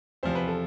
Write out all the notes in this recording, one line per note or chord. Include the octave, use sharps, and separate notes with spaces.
E2 C3 F3 C5
B4
A4